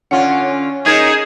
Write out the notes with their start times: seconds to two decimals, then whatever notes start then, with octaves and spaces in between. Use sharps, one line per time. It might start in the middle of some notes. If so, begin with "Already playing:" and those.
0.11 D3 C#4 F4 F#5
0.86 D#4 G#4 A#4 G6 G#6 E7